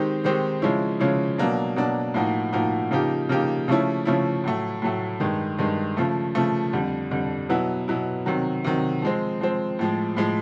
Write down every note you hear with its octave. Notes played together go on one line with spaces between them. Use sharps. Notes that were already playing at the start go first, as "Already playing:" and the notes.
Already playing: D#3 G#3 C4 D#4 G4
D#3 G#3 C4 D#4 G4
C#3 F3 G#3 C#4 E4
C#3 F3 G#3 C#4 E4
B2 F#3 A#3 D4
B2 F#3 A#3 D4
A2 F3 A#3 D#4 F#4
A2 F3 A#3 D#4 F#4
C#3 F3 A#3 D#4 G4
C#3 F3 A#3 D#4 G4
C#3 F3 A3 C#4 E4
C#3 F3 A3 C#4 E4
A2 F#3 A3
A2 F#3 A3
G2 D#3 G#3
G2 D#3 G#3
C#3 F3 A3
C#3 F3 A3
F2 D3 G3
F2 D3 G3
B2 F#3 B3 E4
B2 F#3 B3 E4
C3 D#3 F#3
C3 D#3 F#3
F3 G#3 C4
F3 G#3 C4
A2 F3 G#3
A2 F3 G#3